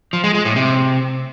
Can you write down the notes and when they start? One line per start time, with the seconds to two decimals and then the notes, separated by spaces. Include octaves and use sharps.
0.13 F3
0.24 G#3
0.35 G#3
0.45 A2
0.56 C3